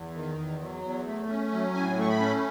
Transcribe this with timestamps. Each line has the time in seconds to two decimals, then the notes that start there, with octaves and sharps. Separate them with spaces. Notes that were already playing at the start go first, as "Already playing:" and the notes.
Already playing: E2
0.15 D#3
0.38 E2
0.61 F#3
0.83 E2
1.06 A3
1.29 C#4
1.52 F#3
1.74 A2 G#5
1.98 A3 C#6
2.09 B5
2.20 C#4